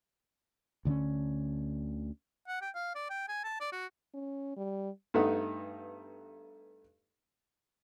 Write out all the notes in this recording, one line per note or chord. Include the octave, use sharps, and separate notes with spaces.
D2 D3 B3 C#4
F#5
G5
F5
D5
G5
G#5
A5
D5
F#4
C#4
G3
G2 A3 B3 D#4 A4 F#5